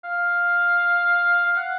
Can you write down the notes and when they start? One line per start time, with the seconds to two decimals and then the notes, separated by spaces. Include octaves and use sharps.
0.04 F5
1.46 F5
1.56 F#5